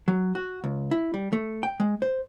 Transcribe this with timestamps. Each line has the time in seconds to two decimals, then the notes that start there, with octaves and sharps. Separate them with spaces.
0.08 F#3
0.35 F#4
0.64 C#2
0.91 E4
1.14 G3
1.33 A3
1.63 G5
1.80 G#3
2.02 C5